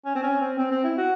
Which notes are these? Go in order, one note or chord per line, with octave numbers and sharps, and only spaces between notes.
C#4
C4
C#4
C4
C4
C4
E4
F#4